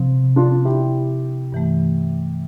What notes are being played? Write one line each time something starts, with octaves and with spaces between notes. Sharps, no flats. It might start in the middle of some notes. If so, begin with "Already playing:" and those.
Already playing: C3 F3 C4
D4 F4
E4 G4
G2 E3 A3